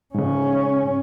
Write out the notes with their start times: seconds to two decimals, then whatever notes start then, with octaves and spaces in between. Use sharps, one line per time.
0.15 G#2 C#3 C#4